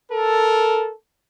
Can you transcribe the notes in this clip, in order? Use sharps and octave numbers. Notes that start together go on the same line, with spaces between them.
A4 A#4